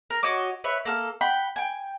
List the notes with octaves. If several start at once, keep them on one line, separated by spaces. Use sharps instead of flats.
A#4
F#4 C#5 D#5 D6
B4 C#5 E5
A#3 A4 F6
F#5 G5 B5
G5 G#5